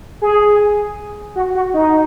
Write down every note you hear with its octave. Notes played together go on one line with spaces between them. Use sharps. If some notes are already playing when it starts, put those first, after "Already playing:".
G#4
F#4
F#4
D#4